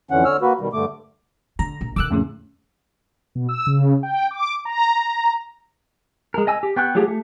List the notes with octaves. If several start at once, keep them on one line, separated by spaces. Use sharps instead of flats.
F2 D3 E3 C#4 F#5
D3 C#5 E6 F6
A#3 F#4 B4
B2 D#3 G3
G2 D3 A3 D6
D3 A#5
A#1
D3 D#3 D6 E6 F#6
F2 A2 C#3
B2
E6
C#3
G5
D6
A#5
G#3 A#4
D#5 G#5 E6
G4
B3 G5 C#6 F#6
F#3 A3 F4 G4 G#4
A3